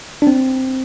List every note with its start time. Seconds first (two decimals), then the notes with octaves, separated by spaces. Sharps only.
0.22 D4
0.27 C4